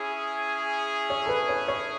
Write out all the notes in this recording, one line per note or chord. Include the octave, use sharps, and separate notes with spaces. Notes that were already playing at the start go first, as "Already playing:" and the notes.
Already playing: C#4 E4 G#4
C#5
A4
B4
C#5
C#5